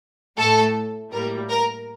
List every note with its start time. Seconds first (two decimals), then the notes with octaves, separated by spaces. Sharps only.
0.37 A2 A3 A4
1.12 A2 G3 A#3 A#4
1.49 A#4